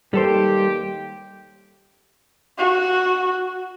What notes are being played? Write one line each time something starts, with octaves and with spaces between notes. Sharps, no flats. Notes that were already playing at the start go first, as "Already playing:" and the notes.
D#2 G3 G4 A4 C5
F#4